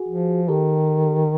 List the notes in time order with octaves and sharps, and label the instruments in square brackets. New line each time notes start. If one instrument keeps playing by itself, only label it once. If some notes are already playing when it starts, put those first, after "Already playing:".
Already playing: [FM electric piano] F#4 G#4
[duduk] F3
[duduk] D#3 [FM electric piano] G4 A4